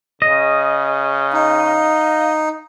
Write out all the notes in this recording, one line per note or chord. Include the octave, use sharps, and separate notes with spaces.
C#3 D#5
D#4 F5